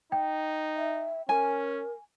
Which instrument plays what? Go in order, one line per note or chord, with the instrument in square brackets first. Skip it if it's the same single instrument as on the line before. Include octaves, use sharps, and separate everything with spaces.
[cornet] D#4 [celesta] G5
[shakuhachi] E5
[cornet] C#4 [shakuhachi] A#4 [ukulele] G#5